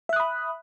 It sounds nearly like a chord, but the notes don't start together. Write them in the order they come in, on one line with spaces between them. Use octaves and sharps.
E5 F#6 D#6 B5